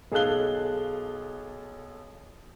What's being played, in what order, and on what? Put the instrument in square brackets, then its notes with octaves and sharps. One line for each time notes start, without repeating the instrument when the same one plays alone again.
[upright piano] B1 G#4 A4 F5 F#6 G7